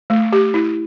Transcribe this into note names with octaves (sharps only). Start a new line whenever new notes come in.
A3
G4
E4